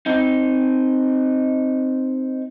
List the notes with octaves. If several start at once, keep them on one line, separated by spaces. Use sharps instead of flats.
C4 D#4